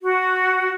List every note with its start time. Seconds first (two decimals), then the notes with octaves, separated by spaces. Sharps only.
0.02 F#4